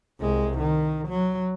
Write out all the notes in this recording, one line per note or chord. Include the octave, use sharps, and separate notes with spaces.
C2 G#3
D#3
F#3